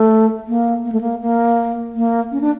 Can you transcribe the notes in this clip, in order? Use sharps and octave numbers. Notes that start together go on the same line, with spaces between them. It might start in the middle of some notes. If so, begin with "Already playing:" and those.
Already playing: A3
A#3
A#3
A3
A#3
A#3
A#3
C#4
D4